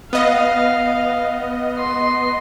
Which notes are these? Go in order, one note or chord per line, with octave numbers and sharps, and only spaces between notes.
B3 D#5 F5
C6